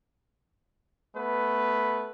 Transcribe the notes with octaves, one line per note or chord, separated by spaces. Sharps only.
A3 B3 B4